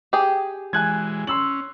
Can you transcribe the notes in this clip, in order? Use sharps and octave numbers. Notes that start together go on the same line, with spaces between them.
G4 G#4
E3 G#3 G#5 F#6 G#6
C#4 C6 E6 F#7